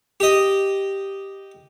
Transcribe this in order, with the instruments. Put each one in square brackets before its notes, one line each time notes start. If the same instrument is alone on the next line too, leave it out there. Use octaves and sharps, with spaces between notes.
[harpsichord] G4 D#5